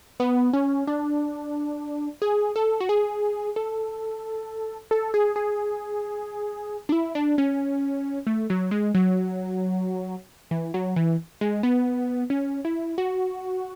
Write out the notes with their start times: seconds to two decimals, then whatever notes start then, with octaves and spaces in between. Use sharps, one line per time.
0.20 B3
0.53 C#4
0.87 D4
2.22 G#4
2.56 A4
2.80 F#4
2.89 G#4
3.56 A4
4.91 A4
5.14 G#4
5.36 G#4
6.89 D4
6.92 E4
7.15 D4
7.38 C#4
8.27 A3
8.50 F#3
8.71 G#3
8.95 F#3
10.51 E3
10.74 F#3
10.96 E3
11.41 G#3
11.63 B3
12.30 C#4
12.65 E4
12.98 F#4